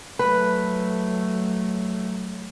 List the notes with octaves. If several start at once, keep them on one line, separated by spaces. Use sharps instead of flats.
F#3 A3 B4